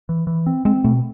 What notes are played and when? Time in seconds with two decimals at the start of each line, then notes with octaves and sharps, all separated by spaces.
0.09 E3
0.27 E3
0.46 C4
0.65 G#3 C4
0.84 B2 A3